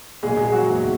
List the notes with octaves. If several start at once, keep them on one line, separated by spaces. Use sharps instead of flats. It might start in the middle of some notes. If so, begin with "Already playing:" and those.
A#1 A#2 F#3 G#3 G#4
G#3 G#4
F#3 F#4
F#1 E2 D#3 F#3